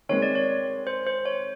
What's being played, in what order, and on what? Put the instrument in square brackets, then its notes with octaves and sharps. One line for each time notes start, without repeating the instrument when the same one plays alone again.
[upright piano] D#3 G#3 C4 [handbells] C#5
[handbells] D5
C#5
C5
C5
C#5